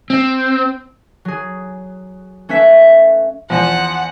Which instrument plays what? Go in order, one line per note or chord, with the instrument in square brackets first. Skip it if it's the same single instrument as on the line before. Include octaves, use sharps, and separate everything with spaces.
[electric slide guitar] C4
[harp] F#3 G#4
A3 C#4 B4 E5 B6
[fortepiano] E2 F3 [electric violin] F#5